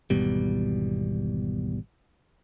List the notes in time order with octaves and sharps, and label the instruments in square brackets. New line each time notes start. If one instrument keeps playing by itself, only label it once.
[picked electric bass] G#1 E2 B2 G3